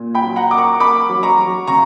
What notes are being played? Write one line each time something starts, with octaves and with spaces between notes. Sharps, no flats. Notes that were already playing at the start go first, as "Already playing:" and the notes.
Already playing: A#2
G5 B5
F#3
F#5 A#5
A#3 D6
A#5 C#6
A#3 B5 D6
F#3
A#5 C#6
F#3
C#3 A#5 C#6